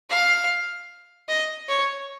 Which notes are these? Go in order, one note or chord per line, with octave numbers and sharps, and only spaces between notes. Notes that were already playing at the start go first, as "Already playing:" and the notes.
F5
D#5
C#5